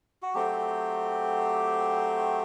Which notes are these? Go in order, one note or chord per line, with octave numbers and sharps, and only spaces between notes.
F#4
F#3 A3 C4 G4